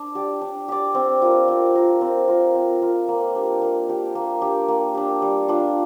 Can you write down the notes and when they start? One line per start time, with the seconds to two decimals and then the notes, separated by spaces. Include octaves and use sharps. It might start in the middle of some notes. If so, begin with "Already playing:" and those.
Already playing: D4
0.15 G4 D5
0.41 D4
0.68 G4 D5
0.95 C4
1.22 F4 A#4
1.48 C4
1.75 F4 A#4
2.01 C4
2.28 F4 A#4
2.55 C4
2.82 F4 A#4
3.08 A#3
3.35 D4 G4
3.62 A#3
3.89 D4 G4
4.15 A#3
4.41 D4 G4
4.68 A#3
4.95 D4 G4
5.22 G3
5.48 D4 F4